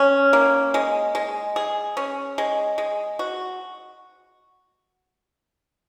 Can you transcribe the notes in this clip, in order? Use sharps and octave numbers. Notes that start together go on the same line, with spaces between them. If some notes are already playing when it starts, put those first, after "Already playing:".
Already playing: C#4
A#3
G#3
G#3
G#4
C#4
G#3
G#3
F#4